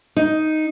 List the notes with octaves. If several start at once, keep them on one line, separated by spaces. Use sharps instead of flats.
D#4